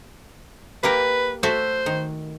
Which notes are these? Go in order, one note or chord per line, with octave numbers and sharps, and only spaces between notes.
A#3 G4 A#4 B4
A3 F#4 C5 E5
D#3